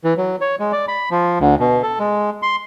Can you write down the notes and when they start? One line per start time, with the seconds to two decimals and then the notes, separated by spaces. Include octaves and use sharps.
0.04 E3
0.17 F#3
0.41 C#5
0.59 G#3
0.73 D5
0.88 B5
1.11 F3
1.40 D2
1.60 B2
1.83 A4
1.99 G#3
2.42 C6